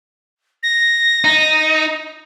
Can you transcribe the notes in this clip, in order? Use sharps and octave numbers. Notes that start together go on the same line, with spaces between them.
A#6
D#4